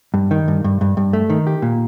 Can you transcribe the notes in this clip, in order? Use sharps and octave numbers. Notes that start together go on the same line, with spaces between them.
G2
D#3
G2
G2
G2
G2
A3
D#3
G4
A#2